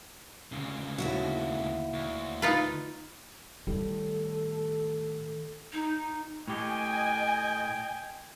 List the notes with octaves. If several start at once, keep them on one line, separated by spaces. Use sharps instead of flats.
D2 C#3
D#2 E4 F#4
D2
D#4 F4 B4
A2 D#3 G3 A4
D#4
A2 G4 D#5 G5 G#5